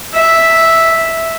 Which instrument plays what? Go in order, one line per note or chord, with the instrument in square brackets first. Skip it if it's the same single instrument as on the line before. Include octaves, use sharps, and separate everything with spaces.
[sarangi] E5